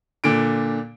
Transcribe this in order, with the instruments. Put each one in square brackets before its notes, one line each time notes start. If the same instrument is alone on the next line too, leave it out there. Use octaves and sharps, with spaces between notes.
[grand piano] A#2 D3 D7